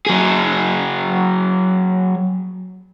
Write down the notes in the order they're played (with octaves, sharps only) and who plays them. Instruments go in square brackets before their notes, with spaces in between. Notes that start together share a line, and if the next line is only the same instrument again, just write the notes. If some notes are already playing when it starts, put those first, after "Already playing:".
[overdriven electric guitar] F#3 G#4